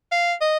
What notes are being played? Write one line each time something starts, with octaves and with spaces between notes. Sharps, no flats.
F5
D#5